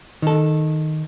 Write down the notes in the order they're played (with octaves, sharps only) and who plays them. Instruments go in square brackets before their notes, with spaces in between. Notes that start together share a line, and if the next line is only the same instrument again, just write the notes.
[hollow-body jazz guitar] D#3 A4